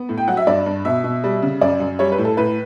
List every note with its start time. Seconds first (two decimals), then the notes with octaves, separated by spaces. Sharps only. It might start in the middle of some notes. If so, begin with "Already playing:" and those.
Already playing: B3
0.09 A2
0.18 G5
0.28 F#3 F#5
0.37 E5
0.47 G2 D5
0.66 G2
0.85 B2 E5
1.04 B2
1.24 G3
1.42 C#3
1.61 F#2 D5
1.80 F#2
1.99 G3 C#5
2.12 B4
2.18 A2
2.25 A4
2.37 A2 B4